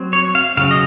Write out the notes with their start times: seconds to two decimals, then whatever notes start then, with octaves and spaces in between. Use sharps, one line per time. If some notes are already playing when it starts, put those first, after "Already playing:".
Already playing: F#3 C4
0.13 C#5
0.35 F5
0.57 C#3 F#3 C#4 F5
0.71 D#5